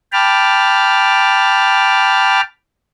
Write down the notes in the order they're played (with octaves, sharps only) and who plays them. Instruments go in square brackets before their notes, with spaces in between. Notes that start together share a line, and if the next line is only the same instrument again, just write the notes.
[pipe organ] G5 A5 B5 D6 F6